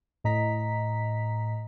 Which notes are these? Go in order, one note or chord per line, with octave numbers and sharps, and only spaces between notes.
A2 D#5 A#5 B6